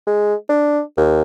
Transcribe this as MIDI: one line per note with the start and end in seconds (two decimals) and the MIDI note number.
0.07 0.35 56
0.49 0.81 62
0.97 1.22 39